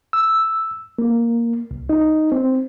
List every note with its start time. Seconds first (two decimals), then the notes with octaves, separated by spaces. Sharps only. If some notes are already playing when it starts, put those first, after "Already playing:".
0.13 E6
0.99 A#3
1.71 C2
1.89 D#4
2.32 C4